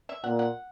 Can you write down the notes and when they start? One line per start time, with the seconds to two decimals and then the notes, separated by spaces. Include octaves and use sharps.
0.09 E5
0.24 A#2 F#5
0.39 F#5